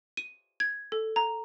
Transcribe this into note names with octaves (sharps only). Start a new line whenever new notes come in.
D#7
G#6
A4
A#5